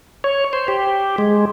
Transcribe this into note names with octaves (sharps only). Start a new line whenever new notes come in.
C#5
C5
G4
G#3